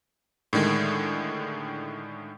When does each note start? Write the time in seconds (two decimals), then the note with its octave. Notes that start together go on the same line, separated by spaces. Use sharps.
0.53 A2 D3 D#3 G#3